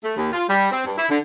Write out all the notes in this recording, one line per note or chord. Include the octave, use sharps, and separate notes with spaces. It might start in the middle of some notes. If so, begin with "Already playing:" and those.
A3
D#2
F4
G3
C4
G2
E4
D3